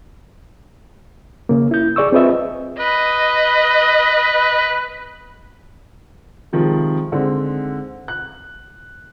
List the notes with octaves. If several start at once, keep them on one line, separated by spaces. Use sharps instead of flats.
C#3 A#3
E4 G6
G#4 D5 C#6 E6
C4 F4 G#4 B4 D#5 E5
B4 D#5
C3 D#3 F3 G#3
D3 G#3 C4 D#4
F#6